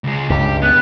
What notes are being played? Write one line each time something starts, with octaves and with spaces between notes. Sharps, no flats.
C#2 G#3
C#2 G2 G4
B3 F#6